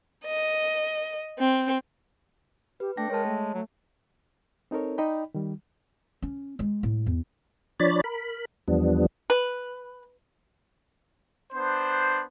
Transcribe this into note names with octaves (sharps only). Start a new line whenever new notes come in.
D#5
C4
G4 B4
A3 D4 G5 A#6
G#3 A#4 C#5 A5
A3
F#3 A3
C4 D#4 A4 A#4 C#5
D#4 D5 D#5 G5 B5
D#3 G3
C#4
G#3
A2
E2
F3 D4 C#5 D5 B5 A6
A#4 B5
E2 F3 G3 B3 D4
B4
B3 D4 C5